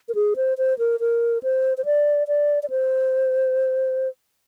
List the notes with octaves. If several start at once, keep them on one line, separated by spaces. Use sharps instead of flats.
A#4
G#4
C5
C5
A#4
A#4
C5
C5
D5
D5
D5
C5